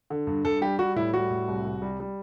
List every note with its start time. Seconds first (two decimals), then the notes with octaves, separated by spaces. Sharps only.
0.10 D3
0.27 G2
0.45 G2 A4
0.61 G3 G4
0.79 G3 F#4
0.96 A2 E4
1.13 G3 F#4
1.30 A2
1.48 C2
1.65 C2
1.82 G3
2.00 G3